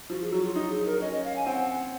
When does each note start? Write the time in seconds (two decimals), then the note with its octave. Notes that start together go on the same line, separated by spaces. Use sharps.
0.10 F3 F#4
0.22 G#4
0.32 F#3 F#4
0.44 F4
0.56 D#4
0.70 G#4
0.86 A#4
1.01 C#4 D#5
1.12 D#5
1.24 F5
1.36 G#5
1.46 C4 F#5